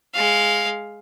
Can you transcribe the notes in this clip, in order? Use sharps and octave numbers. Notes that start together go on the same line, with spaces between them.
G#3 F5